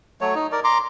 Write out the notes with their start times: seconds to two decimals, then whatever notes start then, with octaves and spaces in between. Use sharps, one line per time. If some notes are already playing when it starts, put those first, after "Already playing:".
0.21 F#3 A3 C#5
0.35 D#4
0.52 A#4 D5
0.64 A#5 C6 D6